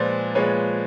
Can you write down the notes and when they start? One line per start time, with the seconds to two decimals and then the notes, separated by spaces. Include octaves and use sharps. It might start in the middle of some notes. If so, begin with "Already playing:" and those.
Already playing: A#2 F3 G#3 B4 C5 D5
0.35 A#2 F3 G#3 B4 C#5